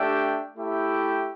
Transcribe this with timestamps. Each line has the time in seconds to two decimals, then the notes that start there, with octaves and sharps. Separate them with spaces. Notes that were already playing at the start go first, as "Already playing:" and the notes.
Already playing: A3 D4 G4 E5 G5
0.56 A3 E4 G4 E5 G5